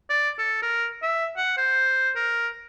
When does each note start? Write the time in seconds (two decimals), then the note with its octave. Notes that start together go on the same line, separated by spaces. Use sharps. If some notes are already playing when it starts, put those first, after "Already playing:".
0.10 D5
0.39 A4
0.63 A#4
1.03 E5
1.37 F#5
1.58 C5
2.16 A#4